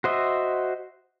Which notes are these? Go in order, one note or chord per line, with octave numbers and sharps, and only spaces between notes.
F#4 C5 D#5 E5